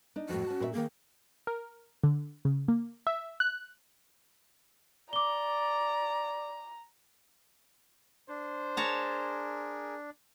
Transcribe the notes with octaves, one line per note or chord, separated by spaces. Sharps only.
D4 D#4
F2 A2 F#4
C#4 A5
A#2 C5 E5
D#3 A#3 G#4
A#4
D3
C#3
A#3
E5
F#6
D5 A#5 D6 G7
D4 C5
G#4 A#4 C#5 A5 A#5